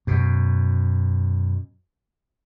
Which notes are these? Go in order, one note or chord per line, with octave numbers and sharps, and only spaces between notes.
F#2 B2